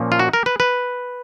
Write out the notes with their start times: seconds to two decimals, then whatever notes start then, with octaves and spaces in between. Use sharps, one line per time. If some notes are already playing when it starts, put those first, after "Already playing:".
Already playing: A#2 F3 A#3 C#4
0.12 F4
0.19 F#4
0.33 A#4
0.46 B4
0.60 B4